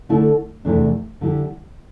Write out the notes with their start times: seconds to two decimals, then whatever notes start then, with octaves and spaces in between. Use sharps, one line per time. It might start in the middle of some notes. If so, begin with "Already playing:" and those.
0.09 D3 A3 E4 A4
0.65 E2 C3 E3 A3 D4
1.21 D3 G3 E4 G4